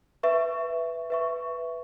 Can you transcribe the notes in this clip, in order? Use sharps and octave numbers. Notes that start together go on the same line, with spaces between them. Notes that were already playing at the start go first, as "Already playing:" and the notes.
B4 E5 C#6
B4 E5 C#6